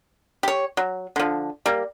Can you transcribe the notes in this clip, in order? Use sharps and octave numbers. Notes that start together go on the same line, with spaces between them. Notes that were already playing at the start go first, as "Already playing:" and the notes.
G4 C#5
F#3
D3 F3
G3 A#3